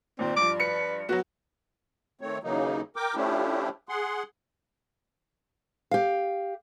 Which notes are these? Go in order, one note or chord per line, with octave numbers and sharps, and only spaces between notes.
D#2 A#2 C4 D5
G2 F3 D6
B4 C#7
F#3 B3 F#4
D#3 A3 C4 C#5
D#2 C#3 E3 F#3 A#3 D#4
A#4 G5 D6
F3 A3 C#4 D4 E4 G4
G#4 F#5 C6
G4 F5